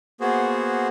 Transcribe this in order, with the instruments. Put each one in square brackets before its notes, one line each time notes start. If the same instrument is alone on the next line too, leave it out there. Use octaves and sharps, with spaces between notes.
[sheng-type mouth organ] A#3 B3 F#4 G#4 C5